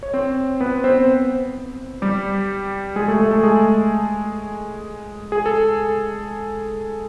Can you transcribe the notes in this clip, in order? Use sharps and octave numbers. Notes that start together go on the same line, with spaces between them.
C#5
C4 C5
B3 B4
C4 C5
G3 G4
G#3 G#4
A3 A4
A3 A4
A3 A4
G#3 G#4
G#4
A4